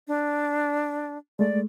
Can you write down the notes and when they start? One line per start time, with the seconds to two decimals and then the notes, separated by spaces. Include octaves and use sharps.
0.08 D4
1.39 G#3 A3 D5